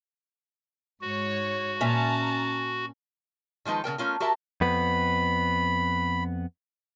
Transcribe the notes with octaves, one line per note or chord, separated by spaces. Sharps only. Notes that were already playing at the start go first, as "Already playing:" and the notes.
G#2 F#4 C#5
A#2 C#4 E5 A5 A#5
D#3 F3 G#3 D#4 B4
C#3 A3 A#4 G5
A3 C#4 F4 A#4
F#4 G4 A#4 E5 A5
F2 B3 B5